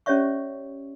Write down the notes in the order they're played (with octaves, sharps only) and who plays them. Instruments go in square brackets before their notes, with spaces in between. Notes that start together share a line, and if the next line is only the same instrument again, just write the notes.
[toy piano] C#4 G4 C#5 D5 E5 C#6